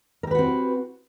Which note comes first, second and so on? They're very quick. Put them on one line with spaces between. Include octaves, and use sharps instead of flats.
A#4 G4 B4 F#4 C4